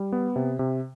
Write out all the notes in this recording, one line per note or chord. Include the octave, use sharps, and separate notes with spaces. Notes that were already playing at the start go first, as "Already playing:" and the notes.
Already playing: G3
B3
C3
C3